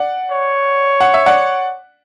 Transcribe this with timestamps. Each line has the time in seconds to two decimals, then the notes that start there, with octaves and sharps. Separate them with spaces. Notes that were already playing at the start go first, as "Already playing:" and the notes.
Already playing: D5 F#5
0.31 C#5
1.01 F#5
1.14 E5
1.26 D5 F#5